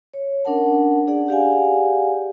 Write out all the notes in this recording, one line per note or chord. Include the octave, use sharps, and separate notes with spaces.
C#5
C#4 D4 A#4 F#5 A5
D4 G#4 D5 F#5
G4 G#4 D5 F5 F#5 G#5